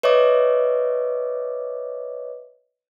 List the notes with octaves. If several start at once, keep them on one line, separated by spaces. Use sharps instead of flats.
B4 C#5 D#5 E5 D6